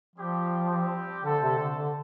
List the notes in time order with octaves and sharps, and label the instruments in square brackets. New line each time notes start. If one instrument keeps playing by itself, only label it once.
[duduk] F3 [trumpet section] G3 C4 G4
[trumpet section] G3 C4 G4
[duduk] D3 [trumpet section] A3 D4 A4 C5
[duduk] C3
D3
D3